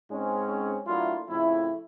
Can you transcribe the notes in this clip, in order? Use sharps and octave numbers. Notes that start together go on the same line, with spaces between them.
G#2 G#3 C4 C#4
F#3 A3 A#3 D4 E4 F4
F2 A2 C#3 E4